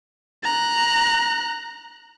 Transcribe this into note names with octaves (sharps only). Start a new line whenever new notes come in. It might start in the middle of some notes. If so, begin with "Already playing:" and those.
A#5 F#6